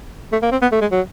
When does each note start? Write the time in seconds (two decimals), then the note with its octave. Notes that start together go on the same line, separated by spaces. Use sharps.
0.32 A3
0.42 A#3
0.52 C4
0.62 B3
0.72 A3
0.81 G#3
0.92 F#3